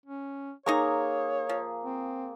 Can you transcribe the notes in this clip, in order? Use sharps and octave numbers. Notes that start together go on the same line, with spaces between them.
C#4
A#3 D#4 G#4 C#5 A#5 C#6
F3
C4